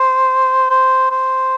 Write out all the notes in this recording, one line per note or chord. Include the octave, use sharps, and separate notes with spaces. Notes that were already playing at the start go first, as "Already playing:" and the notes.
Already playing: C5
C5
C5